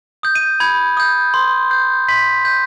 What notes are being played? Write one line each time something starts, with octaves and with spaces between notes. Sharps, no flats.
D#6 G6
D#7
B5 G#6
D#6 G6
C6
G6
C6 B6
G6